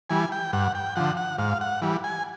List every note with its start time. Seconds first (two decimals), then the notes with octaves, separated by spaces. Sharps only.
0.10 E3 G3 G#5
0.32 G5
0.53 G2 F#5
0.75 G5
0.96 D3 F3 F#5
1.17 F#5
1.38 G#2 F5
1.61 F#5
1.82 E3 G3
2.04 G#5